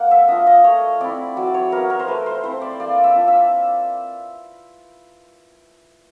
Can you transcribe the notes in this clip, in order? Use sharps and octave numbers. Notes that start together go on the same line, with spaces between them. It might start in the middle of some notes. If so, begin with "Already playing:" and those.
Already playing: A#3 F#5
E5
D4 F4 D#5
D#5
A3 C#5
C4 E4 D5
F#3 D5
C#5
B3 E4 A#4
A#4
C5
A3 B4
C5
C4 E4 C5
D5
A#3 D5
E5
D4 F4
E5